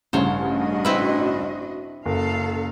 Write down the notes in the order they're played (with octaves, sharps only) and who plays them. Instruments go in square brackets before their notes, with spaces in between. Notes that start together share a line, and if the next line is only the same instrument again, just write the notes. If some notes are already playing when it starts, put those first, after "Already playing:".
[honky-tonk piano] A1 G2 C#3 [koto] C5 C#5
[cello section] D4 F#4 D#5
[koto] C4 E4 B4
[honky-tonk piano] F#1 [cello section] C#3 A4 F5